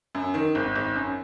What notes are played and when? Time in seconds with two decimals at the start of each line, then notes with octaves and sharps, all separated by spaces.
0.15 F#2
0.34 D#3
0.55 G#1
0.76 G#1
0.95 F#2